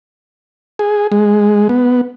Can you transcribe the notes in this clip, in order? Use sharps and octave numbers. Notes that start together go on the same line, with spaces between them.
G#4
G#3
B3